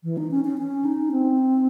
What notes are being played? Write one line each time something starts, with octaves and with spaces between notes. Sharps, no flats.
E3
D#4
C#4
C#4
C#4
D#4
C4